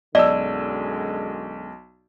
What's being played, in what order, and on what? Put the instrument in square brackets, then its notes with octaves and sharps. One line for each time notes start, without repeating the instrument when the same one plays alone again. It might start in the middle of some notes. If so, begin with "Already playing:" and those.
[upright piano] B1 E6 [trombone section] F#2 D3 G#3 [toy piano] D5 [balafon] D#5